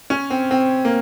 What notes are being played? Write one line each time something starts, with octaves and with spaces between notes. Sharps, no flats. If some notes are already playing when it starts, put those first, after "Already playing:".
C#4
C4
C4
A#3